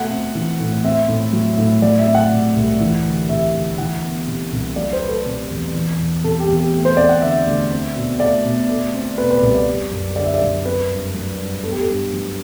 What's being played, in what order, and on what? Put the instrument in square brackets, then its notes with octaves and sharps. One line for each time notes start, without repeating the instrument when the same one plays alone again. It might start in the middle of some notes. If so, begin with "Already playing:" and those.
Already playing: [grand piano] B2 A3 F#5
C4
E3
A2
C4 E5
A2
F#3
A2
F#3 D5
E5
C4
F#5
C3
C2
E3
D2
C3 E5
D2
E3 F#5
B3
C3
C2
F#3 D5
C5
A3 B4
A4
C3
E2
E3
E2
C3 A4
G4
E2
G4
A3
C5
C4 D5
F#5
D3 E5
D2
C4
B2
A3 D5
B2
A3
C4
B2 B4
B4
C2 B4
D5
G3
F#2
D3 D5
E5
D5
F#2
C4 B4
G2
F#3
G2
B3 A4
G4
A4
G2
F#3